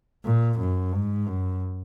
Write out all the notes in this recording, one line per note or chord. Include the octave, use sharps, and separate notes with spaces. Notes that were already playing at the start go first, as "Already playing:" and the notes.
A#2
F#2
G#2
F#2